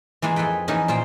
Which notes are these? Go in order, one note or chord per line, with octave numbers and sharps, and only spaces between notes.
E3 G#3 A#3 F4
F2 G#4 A4 B4 G5
E3 F3 A#3 C#4 D#4 B4
A#2 F4 C5 G5